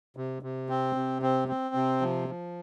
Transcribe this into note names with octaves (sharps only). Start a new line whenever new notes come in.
C3
C3
C4
C3
C4
C4
C3
F3
F3